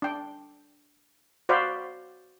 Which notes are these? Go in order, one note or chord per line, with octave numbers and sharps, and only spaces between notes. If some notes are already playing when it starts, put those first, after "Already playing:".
D4 G5
F#4 C5 D5 F5 B5